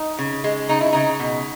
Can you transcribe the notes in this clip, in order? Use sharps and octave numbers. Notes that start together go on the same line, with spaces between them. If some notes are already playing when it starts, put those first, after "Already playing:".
Already playing: D#4
C#3
G#3
C#3 D#4
E4
C#3 D#4
B2